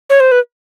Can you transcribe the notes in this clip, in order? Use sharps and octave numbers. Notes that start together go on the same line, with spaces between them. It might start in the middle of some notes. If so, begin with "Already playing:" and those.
C#5
C5
B4